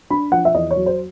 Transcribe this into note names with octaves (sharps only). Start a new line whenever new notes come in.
D4 B5
F3 F#5
E5
E2 D#5
C#5
F#3
C5